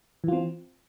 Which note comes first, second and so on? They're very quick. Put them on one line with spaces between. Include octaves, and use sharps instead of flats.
E3 F4 C4